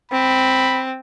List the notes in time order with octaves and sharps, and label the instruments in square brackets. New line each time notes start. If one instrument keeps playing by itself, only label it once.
[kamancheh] C4 [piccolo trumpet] B5